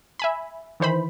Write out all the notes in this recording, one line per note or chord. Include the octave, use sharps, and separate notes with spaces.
E5 G#5 B5
D#3 E3 C5 B5